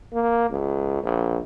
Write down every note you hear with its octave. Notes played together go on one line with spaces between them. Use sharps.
A#3
C#2
A#1